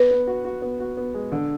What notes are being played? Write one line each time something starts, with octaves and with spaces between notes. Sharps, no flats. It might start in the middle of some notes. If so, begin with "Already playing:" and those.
Already playing: B3 B4
B3
F#4
F#4
B3
F#4
B3
G#3
D3